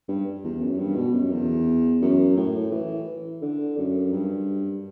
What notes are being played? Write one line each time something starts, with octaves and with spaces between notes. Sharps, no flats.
G2
E2
F#2
G2
B2
F#2
E2
F#2
A2
E3
D3
F#2
G2